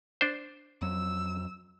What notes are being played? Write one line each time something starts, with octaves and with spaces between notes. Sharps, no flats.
D4 C5
F2 F#3 E6